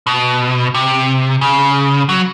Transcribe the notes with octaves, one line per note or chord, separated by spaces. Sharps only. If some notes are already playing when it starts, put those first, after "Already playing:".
B2
C3
C#3
F#3